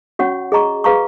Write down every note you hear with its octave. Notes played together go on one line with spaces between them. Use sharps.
C#4 F#4 C#5 F#5 C#6
G#4 D#5 A#5 C#6
G#4 B4 F5 A#5 C#6